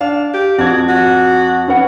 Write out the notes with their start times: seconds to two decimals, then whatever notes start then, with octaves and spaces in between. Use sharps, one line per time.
0.01 D4 F5
0.34 G4
0.58 F2 F#4 G#6
0.89 F#4
1.68 C#4 B4 F#5